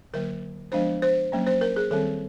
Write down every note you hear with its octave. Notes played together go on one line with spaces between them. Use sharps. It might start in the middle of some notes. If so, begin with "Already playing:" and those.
D3 F#3 A#3 A#4
F3 G#3 B3 D4 C5
C5
F#3 A#3 C#4
C5
A#4
G#4
D#3 G3 C4 A4